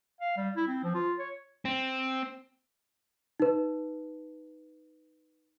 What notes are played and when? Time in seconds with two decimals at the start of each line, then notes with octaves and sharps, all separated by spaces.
0.21 F5
0.37 G3
0.56 E4
0.68 C4
0.84 F3
0.95 F4
1.19 C#5
1.65 C4
3.40 D#4 B4